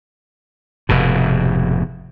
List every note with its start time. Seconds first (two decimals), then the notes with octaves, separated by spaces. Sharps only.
0.89 F1 G#2 B2